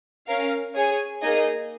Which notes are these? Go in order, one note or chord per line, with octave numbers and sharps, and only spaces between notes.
C#4 A#4 F5
G#4 C#5 G#5
A#3 D#4 G#4 D#5